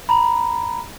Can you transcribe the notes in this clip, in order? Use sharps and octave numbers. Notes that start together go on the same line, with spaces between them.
A#5 B5